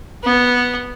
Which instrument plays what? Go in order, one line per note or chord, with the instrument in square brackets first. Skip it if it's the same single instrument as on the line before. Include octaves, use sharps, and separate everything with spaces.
[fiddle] B3